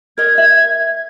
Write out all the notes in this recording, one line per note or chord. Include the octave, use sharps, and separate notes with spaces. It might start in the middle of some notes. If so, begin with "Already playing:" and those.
A#4 D#5 G#6
E5